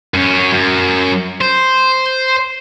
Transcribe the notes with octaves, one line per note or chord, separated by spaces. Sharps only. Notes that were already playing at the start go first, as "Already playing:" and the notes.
F#2 C#4
F#2
C5